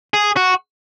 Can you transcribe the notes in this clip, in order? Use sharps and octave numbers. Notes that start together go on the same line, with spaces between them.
G#4
F#4